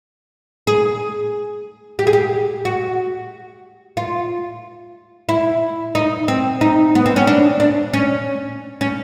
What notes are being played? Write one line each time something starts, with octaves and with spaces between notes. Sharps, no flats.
G#4
G4
G#4
G4
F#4
F4
E4
D#4
C4
D#4
B3
C4
C#4
D4
D4
C#4
C#4